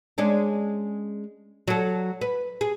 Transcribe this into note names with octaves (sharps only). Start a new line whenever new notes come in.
G#3 C#4 D4
F#3 A4
B4
G#4